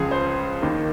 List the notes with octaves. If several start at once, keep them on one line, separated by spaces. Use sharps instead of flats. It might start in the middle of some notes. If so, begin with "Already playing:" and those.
Already playing: C#2 C#3 F3 G#4
C5
D#2 D#3 A#3